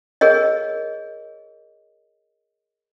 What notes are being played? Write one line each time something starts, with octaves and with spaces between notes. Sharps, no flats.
G#4 A#4 C#5 D#5